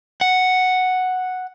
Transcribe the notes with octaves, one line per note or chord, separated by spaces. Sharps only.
F#5